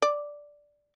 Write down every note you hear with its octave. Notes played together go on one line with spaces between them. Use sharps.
D5